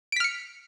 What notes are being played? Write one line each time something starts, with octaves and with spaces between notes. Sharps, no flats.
F6 B6 C#7 D7